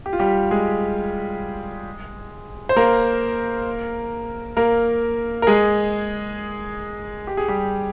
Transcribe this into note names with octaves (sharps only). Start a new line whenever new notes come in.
G4
F4
G3 G4
G#3 G#4
C5
A#3 A#4
A#3 A#4
A#4
G#3 G#4
G4
G#4
G3 G4